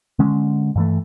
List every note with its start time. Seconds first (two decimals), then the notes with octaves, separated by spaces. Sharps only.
0.19 D3 G#3 C#4
0.76 G2 E3 A3